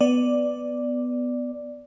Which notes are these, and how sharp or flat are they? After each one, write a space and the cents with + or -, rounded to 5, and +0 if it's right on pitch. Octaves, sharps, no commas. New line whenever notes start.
B3 +10 D5 +0